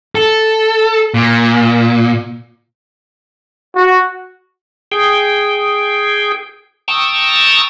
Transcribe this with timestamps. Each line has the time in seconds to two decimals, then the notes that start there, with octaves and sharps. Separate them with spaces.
0.15 A4
1.14 A#2
3.75 F#4
4.92 G#4 G5
6.88 G5 A5 A#5 C#6 D#6 E6